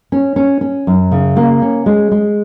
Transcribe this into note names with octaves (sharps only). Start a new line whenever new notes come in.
C#4
C#4
C#4
F#2
C#3
A#3
C#4
G#3
G#3